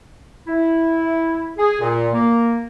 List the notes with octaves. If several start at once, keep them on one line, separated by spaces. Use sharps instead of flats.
E4
G#4
A#2
A#3